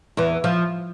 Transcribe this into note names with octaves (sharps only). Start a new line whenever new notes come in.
E2 E3
F3